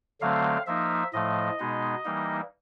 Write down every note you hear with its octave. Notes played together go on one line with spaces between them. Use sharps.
D3 F#3 A3 C4 F5
F3 A#3 D#4 E5
A2 F3 A3 D#5
B2 G#3 B3 D#4
E3 G3 A#3 D#4